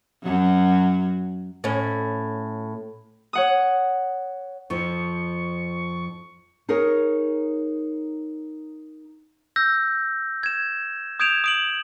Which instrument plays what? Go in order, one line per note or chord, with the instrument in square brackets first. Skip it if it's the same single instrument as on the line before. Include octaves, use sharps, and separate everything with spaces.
[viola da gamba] F#2 F#3
[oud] A2 C#4
[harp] C#5 F#5 D#6
[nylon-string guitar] F2 F3 [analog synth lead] C#6
[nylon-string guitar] D#4 G#4 A#4 C#5
[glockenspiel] E6 G6 A#6
G#6 E7
D#6 G6 G#6 D7 E7 F7
D#6 D7 F#7